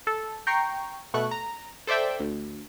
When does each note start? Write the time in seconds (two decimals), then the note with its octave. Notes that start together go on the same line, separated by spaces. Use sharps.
0.07 A4
0.47 G5 A#5 C#6 C7
1.14 B2 A3 C#6 F#6
1.31 A#5
1.87 A4 C5 D5 E5 G5
2.20 D2